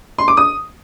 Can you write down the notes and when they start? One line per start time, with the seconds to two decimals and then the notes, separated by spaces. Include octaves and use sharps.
0.18 C6
0.28 D6
0.37 D#6